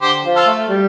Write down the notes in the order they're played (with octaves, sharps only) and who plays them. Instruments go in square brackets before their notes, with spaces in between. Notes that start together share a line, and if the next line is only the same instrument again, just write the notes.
[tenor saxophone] D3 [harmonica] G4 C5
[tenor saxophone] F3
[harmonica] F4 A4
[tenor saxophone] A3
G3